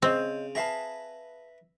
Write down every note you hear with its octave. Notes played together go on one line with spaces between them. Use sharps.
C#3 C4 C5 C#5 D#5
G#4 B4 E5 F5 A5 A#5